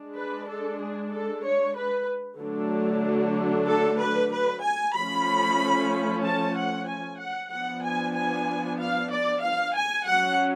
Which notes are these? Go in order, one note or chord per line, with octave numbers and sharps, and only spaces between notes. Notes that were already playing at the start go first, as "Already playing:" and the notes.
Already playing: G#3 D4
B4
A4
G#4
A4
C#5
B4
D3 F#3 A3 D4
A4
B4
B4
G#5
F3 A3 C#4 B5
A5
F#5
G#5
F#5
F3 B3 D4 F#5
G#5
G#5
F5
D5
F5
G#5
F#3 C#4 F#5